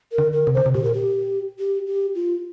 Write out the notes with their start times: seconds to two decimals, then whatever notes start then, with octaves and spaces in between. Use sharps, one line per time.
0.12 A#4
0.18 D3
0.33 A#4
0.47 C3
0.54 D3 C5
0.66 C3
0.74 A#2 G4
0.84 A#4
0.93 G4
1.59 G4
1.87 G4
2.15 F4